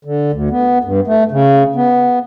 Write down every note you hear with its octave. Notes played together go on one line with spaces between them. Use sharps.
D3
D2
B3
G2
A3
C#3
B3